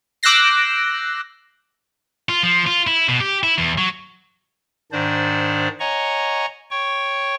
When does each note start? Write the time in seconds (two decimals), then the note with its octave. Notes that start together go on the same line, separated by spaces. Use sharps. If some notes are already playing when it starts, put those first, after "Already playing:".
0.23 D6 E6 F#6 G6 A#6 C7
2.29 F4
2.43 F3
2.67 F4
2.87 E4
3.08 B2
3.20 G4
3.43 E4
3.58 E2
3.78 F#3
4.92 G#2 D#3 D4 C5 D5
5.80 C#5 D#5 F#5 G#5 A#5 C#6
6.71 C#5 G5 C#6